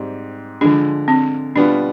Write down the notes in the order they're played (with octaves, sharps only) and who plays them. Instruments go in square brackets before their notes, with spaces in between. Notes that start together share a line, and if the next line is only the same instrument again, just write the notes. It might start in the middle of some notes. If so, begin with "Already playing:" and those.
Already playing: [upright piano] G#2 G3 C4 G4
[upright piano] D3 F3 G#3 [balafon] D4
[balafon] C4
[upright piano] B2 G3 B3 F4 [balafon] D4